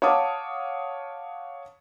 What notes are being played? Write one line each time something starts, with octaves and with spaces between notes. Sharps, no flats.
C#5 F5 F#5 A5 D6 D#6